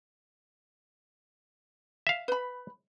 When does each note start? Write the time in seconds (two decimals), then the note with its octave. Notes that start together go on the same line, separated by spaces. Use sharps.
2.07 E5 F5
2.28 B4 B5